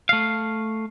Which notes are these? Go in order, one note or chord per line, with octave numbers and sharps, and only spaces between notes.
A3 F5